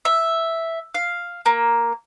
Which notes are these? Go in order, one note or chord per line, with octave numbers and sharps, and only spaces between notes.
E5
F5
A#3